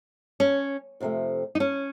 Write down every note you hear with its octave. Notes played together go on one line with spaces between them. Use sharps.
C#4
F2 C3 F3 A3
D#4
C#4